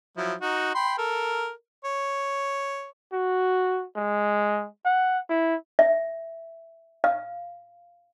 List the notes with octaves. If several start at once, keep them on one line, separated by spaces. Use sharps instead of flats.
F3 F#3 E4
D#4 F#4
G5 B5 C6
A4 A#4
C#5
F#4
G#3
F#5
E4
E5
F5